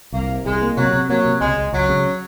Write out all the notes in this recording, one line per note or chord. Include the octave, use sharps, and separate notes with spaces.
C2 A#3
C3
C2 G#3
A#3
C3 F#3
C3
F#3 A#3
C3
C#2 G#3
C#2
C#2 F#3
C#3